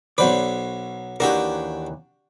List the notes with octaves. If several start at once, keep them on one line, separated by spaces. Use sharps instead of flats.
B1 F#3 B4 C5 D5
D#2 E3 D4 F#4 G4 A#4